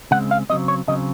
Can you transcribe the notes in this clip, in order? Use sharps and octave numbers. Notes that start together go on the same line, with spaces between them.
C#3 G#3 C4 F#5
F5
C#3 F#3 C4 D#5
C#5
C#3 F#3 C4 D#5